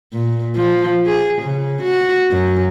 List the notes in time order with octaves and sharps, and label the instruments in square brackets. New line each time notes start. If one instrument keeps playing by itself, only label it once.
[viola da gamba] A#2
F3
G#4
C#3
F#4
F#2